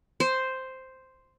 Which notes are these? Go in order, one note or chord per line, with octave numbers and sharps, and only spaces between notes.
C5